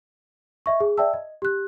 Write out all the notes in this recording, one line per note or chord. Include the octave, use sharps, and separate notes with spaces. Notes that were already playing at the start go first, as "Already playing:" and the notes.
D#5 E5 C#6
G#4
D5 E5 G5 A5 E6
D#5
G4 F#6